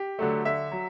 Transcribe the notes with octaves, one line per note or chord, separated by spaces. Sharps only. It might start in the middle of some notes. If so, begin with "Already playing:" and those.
Already playing: G4
D3 F#3 A3
D3 E5
F#3